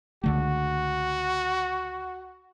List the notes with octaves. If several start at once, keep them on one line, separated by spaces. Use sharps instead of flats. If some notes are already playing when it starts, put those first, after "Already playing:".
C#2 D3 A3 F#4